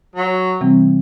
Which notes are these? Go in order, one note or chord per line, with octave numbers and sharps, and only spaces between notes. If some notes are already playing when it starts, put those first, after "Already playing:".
F#3
C3 E3 G3 C4